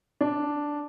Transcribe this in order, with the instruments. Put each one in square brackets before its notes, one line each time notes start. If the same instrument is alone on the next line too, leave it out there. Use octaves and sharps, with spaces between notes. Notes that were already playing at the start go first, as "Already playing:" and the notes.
[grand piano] D4